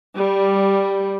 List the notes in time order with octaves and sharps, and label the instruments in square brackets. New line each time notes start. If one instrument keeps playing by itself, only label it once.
[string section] G3